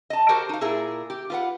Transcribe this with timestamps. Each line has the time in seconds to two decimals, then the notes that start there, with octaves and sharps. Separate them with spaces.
0.10 D#5 A5
0.29 F#4 G4 A4 A#4 C5
0.49 D#4 F5
0.61 A#2 E4 G#4 A#4
1.10 G4
1.30 F4 B4 F#5